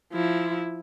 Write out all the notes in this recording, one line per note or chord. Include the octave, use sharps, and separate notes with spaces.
F3 E4